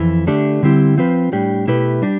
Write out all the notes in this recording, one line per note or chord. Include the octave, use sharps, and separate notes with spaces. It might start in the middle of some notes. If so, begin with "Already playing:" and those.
Already playing: F2 E3
D3 A3 D4 G4
D3 G3 C4 E4 G4
F3 C4 F4 B4
A2 G3 D4 G4
B2 A3 E4 G4 B4
G3 D4 G4